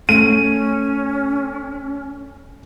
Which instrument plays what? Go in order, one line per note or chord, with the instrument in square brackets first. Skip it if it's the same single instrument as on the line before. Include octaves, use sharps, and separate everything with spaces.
[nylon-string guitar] A3 [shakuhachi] C#4 [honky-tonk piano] D#7